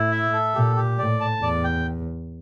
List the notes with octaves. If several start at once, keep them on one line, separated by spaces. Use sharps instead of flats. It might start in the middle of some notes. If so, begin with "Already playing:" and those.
Already playing: A2 E4
E5
A4
A#2 G4
G4
A2 D5
A5
E2 D5
G5